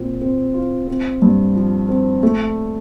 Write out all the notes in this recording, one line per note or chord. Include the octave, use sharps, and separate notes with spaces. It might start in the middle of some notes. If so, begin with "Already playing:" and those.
Already playing: A#2 C4
C4
F4
C4
G2
F3
C4
A3